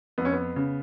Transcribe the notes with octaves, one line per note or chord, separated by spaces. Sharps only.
F2 B3
C#4
B3
C#3